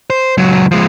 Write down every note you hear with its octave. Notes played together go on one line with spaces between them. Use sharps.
C5
C#2 F#3
F3 G#3